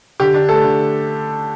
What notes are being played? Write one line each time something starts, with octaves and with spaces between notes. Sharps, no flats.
D3 G4
D4
A3 A4
D3